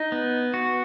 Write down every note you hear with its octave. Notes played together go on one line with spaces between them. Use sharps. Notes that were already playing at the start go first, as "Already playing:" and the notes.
Already playing: D#4
B3
F#4